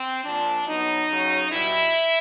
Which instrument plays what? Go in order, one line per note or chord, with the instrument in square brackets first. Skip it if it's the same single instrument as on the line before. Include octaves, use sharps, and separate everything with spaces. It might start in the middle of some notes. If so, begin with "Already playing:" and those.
Already playing: [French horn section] C4
A#2 F3 D4
B2 F#3 D#4
C#3 F#3
B2 G3 E4